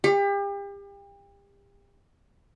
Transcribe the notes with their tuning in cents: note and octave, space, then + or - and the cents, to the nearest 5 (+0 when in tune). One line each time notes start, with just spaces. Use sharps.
G4 +35